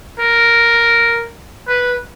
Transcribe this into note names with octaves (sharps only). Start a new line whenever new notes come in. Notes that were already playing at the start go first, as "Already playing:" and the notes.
A#4
B4